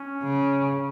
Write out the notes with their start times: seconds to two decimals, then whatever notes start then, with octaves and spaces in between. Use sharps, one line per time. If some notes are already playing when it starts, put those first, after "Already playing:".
Already playing: C#4
0.23 C#3